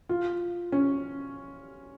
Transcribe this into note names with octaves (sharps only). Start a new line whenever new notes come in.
F4
C#4